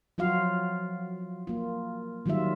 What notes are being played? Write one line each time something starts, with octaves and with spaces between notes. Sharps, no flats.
F3 F#3 F4 F#4 F5
A#3 F4
D#3 F#3 G3 F4 E5